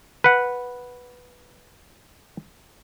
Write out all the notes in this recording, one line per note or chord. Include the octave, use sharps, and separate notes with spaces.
B4 F#5